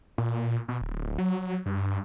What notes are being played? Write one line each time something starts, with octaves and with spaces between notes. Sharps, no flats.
A#2
B2
D1
F#3
G2